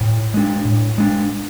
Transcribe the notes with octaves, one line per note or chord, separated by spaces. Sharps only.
A2
G#3 D4
A2
G#3 D4